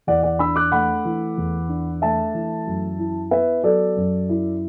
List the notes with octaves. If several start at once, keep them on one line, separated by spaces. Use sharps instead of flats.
E2 D5 F#5
D5 F#5
D4 B5 E6
D6 F#6
A3 F#5 B5
E3
E2
D4
A3 E5 A5
E3
F#2
E4
B3 B4 E5
F#3 A4 D5
F#2
E4